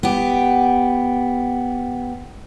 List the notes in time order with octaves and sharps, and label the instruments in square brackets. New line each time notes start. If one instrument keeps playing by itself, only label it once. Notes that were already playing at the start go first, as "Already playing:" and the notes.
[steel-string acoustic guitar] B3 G4